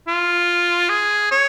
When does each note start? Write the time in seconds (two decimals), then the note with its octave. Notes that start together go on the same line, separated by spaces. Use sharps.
0.08 F4
0.89 G#4
1.31 C#5